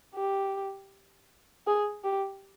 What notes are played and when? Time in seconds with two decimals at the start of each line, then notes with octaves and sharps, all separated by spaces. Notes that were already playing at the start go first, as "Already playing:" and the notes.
0.15 G4
1.67 G#4
2.04 G4